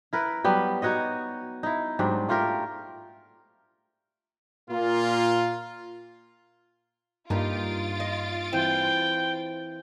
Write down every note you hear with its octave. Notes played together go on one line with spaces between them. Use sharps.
E4 A#4 B4
F#3 G3 B3 G4
D#4 F#4 C#5 D#5
D#4 E4
G#2 F#3 G3 D4
A3 F4 G4 A#4
A#2 A#3 F4
G2 A#3 D#4 F4 G4 A6 D7
D#5
E3 C4 C5 G5